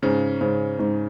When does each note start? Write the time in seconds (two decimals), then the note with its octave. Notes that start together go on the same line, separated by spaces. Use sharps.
0.03 G#2 C#3 C#4
0.41 G#2 C#3 C#4
0.79 G#2